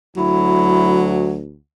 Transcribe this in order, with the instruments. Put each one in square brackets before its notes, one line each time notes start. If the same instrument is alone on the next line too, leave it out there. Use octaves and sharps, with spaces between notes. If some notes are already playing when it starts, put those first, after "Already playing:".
[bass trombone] D2 [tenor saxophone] F#3 [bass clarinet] E4